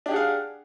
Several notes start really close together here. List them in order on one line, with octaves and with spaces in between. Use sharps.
D4 G4 G#4 F#5 F5